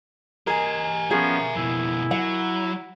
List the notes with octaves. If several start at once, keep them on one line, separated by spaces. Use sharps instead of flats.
G4 G#4 A#4 D#5 G#5
F3 B3 C#4 G#4 E5 A#5
F2 B2 E4
F#3 F#5